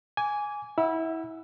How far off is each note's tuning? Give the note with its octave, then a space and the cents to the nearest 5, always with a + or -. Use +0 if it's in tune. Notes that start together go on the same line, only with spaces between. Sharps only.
G#5 +0 D6 -25
E4 -25 F#5 +0 E6 +20